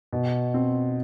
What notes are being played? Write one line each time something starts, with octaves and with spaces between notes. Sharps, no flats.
B2
C4